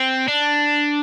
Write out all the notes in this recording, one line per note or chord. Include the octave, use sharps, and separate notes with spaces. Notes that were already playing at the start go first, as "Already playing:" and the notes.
Already playing: C4
D4